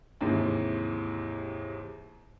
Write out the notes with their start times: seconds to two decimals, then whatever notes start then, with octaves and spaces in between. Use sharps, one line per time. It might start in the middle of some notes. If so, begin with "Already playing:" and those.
0.21 D#2 G#2 C3 E3